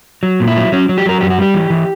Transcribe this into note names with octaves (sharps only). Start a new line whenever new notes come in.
F#3
A#2
E4
F#3
F#3 C#4
F#3
G4
F#3 A#4
F#2 G4
F#4
G3 G4
E3
E3